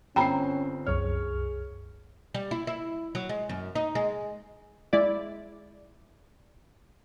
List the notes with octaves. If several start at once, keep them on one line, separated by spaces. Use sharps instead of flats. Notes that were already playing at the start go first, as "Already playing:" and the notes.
G1 C4 C#4 G5 A#5 B5 C7
C2 F#2 G#4 C#5 C#6 F6
G3
E4
E4
F#3
G#3
F#2
D#4
G#3
G#3 E4 D5